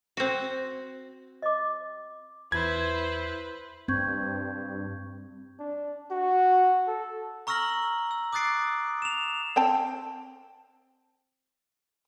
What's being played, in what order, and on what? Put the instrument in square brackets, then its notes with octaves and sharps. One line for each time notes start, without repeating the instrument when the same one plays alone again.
[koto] C4 F#4
[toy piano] D#5 D6
[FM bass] E2 [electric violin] E4 C5 [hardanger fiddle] B4 [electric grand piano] G#6
[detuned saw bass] G2 [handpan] C4 [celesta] C#6 G6 G#6
[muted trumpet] D4
F#4
A4
[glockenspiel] A#5 C#6 E6 F6 A#6 F#7
E6
D6 D#6 F#6 A6 C7 D7
E7 F7
[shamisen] C4 G5 A5